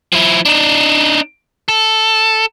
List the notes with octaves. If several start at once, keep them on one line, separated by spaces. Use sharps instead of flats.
F3 E4
D4 D#4
A4